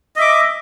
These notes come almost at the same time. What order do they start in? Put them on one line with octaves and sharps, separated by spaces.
D#5 E5 D6